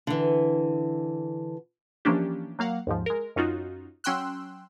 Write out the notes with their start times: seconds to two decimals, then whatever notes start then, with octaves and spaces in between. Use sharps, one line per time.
0.07 D3 E3
2.05 E3 F3 A#3 C#4 D4 G4
2.59 F#3 A#3 F5 F#5
2.87 D#2 G#2 F3
3.06 G#3 A#4
3.36 F#2 C#4 D#4 F4 F#4
4.04 F#3 C#4 G5 C6 E6 F#6